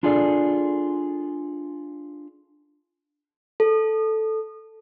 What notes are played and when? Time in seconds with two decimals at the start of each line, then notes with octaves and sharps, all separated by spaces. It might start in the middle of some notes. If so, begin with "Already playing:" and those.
0.03 D4 F4 G#4 A4 D5
3.60 A4